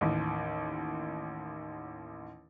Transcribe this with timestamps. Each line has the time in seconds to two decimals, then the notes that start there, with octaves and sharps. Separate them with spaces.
0.01 A1 D#2